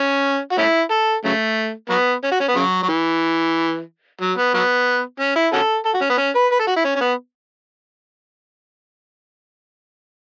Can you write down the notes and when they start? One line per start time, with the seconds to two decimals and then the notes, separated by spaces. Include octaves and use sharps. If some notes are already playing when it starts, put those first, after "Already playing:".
Already playing: C#4
0.52 F#4
0.58 A3 C#4 E4
0.91 A4
1.25 C#3 F#3 A3
1.90 F#3 B3
2.24 C#4
2.31 F#4
2.40 C#4
2.48 B3
2.55 C#3 F#3
2.83 F#3
2.89 E3
4.21 F#3
4.38 B3
4.54 F#3 B3
5.20 C#4
5.36 E4
5.53 C#4 F#4 A4
5.85 A4
5.94 F#4
6.02 C#4
6.10 B3
6.18 C#4
6.35 B4
6.51 B4
6.59 A4
6.67 F#4
6.76 E4
6.84 C#4
6.96 C#4
7.01 B3